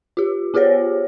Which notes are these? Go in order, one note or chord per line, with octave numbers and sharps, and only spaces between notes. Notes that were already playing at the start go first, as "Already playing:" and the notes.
F4 G4
B3 F4 G4 G#4 C5 C#5